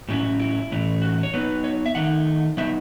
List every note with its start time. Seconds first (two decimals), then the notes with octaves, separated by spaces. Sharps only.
0.09 A2 F#3 C#4 E4
0.40 E4
0.72 A2 E3 A3 C#4
1.02 F#4
1.23 C#5
1.33 F#3 B3 D#4 B4
1.64 C#5
1.86 E5
1.95 D#3 A3 D#4 F#5
2.57 F#3 B3 D#4 E5